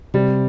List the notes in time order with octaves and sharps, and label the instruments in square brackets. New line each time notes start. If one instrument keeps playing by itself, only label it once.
[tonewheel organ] C3 [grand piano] G3